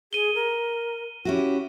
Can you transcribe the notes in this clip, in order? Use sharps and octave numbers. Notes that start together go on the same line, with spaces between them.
G#4 D#7 G7
A#4
C#4 E4 F#4 G4